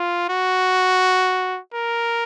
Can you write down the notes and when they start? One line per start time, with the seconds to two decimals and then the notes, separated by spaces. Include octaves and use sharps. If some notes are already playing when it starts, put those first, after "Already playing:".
Already playing: F4
0.30 F#4
1.74 A#4